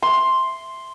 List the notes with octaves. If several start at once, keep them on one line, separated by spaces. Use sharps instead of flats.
C6